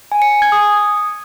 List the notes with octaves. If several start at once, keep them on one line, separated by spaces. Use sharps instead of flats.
G#5
C#7
G#5
G#6
D#6